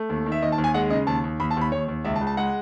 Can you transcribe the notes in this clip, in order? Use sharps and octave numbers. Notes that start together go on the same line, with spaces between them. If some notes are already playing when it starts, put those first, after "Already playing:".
Already playing: A3
D#2
D#3
E5
D#2 D#5
A5
D#2
G#5
G#3 F#5
C#3 D#5
D#2 A5
D#2
D#2 B5
A5
D#2 B5
D#2 C#5
D#2
C#2 E5
A5
C#2
A5
G#3 F#5